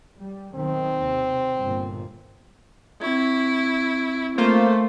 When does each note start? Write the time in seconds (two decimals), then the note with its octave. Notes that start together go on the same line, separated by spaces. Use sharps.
0.19 G3
0.55 B1 D#3 C4
0.98 D#2 C3
1.28 C3
1.59 G1 A#2
3.02 C4 E4 C#6 G#6
4.38 A3 A#3 F4 C5